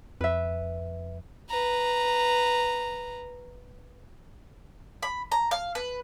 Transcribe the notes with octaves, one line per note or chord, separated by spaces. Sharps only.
F2 B4 E5
B4 A#5
B5
A#5
F5
B4